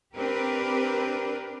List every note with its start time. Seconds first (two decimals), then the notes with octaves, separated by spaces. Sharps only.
0.15 C4 D4 G4 A#4 B4